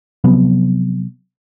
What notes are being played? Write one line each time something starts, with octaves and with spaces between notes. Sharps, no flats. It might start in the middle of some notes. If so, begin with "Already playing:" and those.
C3 F3 F#3 B3